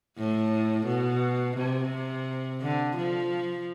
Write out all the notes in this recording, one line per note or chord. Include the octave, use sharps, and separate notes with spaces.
A2
B2
C3
D3
F3